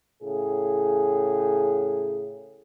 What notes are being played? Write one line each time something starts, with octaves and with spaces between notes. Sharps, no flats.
A2 C#3 G#4